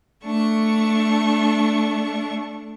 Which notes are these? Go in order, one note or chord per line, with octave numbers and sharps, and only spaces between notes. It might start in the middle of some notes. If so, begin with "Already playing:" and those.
A3 D4 C#6